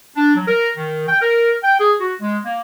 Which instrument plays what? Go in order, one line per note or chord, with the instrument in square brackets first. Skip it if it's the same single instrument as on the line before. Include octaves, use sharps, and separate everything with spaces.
[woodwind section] D4
F#3
A#4
D#3
G5
A#4
G5
G#4
F#4
G#3
A#3